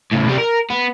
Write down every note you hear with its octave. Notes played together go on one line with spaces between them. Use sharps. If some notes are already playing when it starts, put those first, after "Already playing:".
A2 C#3
C2 G3
A#4
B3